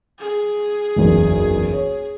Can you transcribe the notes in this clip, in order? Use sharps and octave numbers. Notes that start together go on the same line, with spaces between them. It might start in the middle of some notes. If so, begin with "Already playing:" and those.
G#4
F#1 B1 E2
C#5